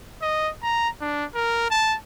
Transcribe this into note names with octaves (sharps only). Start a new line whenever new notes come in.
D#5
A#5
D4
A#4
A5